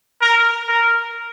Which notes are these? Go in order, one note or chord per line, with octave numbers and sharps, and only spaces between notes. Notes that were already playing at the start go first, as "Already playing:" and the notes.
A#4
A#4